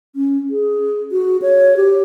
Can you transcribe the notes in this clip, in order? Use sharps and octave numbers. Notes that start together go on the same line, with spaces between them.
C#4
G#4
F#4
C#5
G4